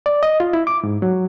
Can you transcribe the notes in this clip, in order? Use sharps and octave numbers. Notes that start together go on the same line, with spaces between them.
D5
D#5
F4
E4
D6
G#2
F#3